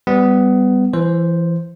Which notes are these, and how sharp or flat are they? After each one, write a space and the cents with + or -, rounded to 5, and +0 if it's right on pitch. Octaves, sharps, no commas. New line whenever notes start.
G3 +0 B3 +20
E3 +25 C5 +0